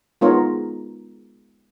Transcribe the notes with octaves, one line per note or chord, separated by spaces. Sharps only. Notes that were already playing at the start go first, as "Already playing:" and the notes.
G#3 B3 D#4 F4 A#4 C#5